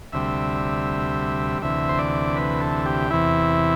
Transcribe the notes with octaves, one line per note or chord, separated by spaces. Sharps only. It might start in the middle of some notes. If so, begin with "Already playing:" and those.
D2 C3 G3 E5
D2 C3 E3 E5
C5
D5
B4
A4
G4
E2 C3 E3 E4